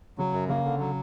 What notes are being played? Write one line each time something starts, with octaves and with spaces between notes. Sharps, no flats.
C#3 F#3
F#2
C#3 A#3
D3
F#3